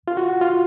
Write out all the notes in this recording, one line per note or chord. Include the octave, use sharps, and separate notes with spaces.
F4
F#4
F4